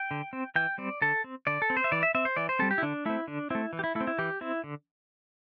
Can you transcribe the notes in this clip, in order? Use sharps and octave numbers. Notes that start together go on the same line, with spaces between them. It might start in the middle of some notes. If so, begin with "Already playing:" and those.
Already playing: G5
D3
C4
E3 G5
G3 C4 D5
D3 A4
C4
D3 D5
A4
C4
C5
E5
E3 D5
E5
C4 E5
C5
E3 D5
C5
G3 C4 A4
G4
E4
D3 D4
A3 C4 E4
D3 D4
A3 C4 E4
E3
G4
E4
A3 E4
C4
E4
E3 G4
C4 E4
D3